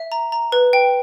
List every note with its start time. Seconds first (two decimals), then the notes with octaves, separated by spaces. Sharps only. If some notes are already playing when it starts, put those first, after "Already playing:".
Already playing: E5
0.12 A#5
0.32 A#5
0.52 B4
0.73 G5